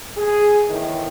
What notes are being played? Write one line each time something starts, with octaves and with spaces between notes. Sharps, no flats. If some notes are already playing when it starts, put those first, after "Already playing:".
G#4
E2 A2 D#3